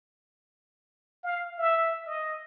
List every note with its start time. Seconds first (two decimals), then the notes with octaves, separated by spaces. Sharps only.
1.23 F5
1.58 E5
2.06 D#5